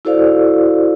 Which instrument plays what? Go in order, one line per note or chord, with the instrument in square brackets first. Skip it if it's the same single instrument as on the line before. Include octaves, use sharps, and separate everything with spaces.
[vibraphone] E4 F#4 A4 C5 D5 F5